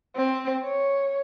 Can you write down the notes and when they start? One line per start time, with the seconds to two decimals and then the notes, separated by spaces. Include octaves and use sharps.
0.16 C4
0.64 C#5